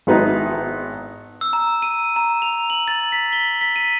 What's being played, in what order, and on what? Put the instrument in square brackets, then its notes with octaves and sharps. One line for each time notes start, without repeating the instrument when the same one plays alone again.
[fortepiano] G#1 B3 D#4 E4
[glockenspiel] E6
A#5
D#7
A#5
F7
F#7
A6
B6
G7
B6
D#7